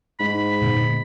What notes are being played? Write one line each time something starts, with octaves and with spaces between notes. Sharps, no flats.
G#2 B5
A#2 D3 B3